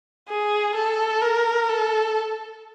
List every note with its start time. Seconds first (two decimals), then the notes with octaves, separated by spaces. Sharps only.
0.28 G#4
0.75 A4
1.21 A#4
1.69 A4